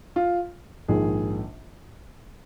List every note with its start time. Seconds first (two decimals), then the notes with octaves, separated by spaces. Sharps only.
0.16 F4
0.88 A#1 G#2 D#3 G#4